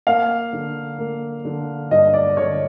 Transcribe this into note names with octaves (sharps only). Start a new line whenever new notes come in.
A#3 F5
D3
A#3
D3
G2 D#5
D5
D3 C#5